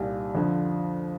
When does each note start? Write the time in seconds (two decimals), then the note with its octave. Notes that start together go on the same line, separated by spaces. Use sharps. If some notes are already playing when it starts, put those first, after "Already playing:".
Already playing: C2 A#2 G3 D#4
0.35 F2 D3 F3